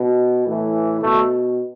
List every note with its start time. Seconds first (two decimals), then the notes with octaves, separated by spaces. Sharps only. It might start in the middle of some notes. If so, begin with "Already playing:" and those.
Already playing: B2
0.45 A2 E3
1.02 B2 A3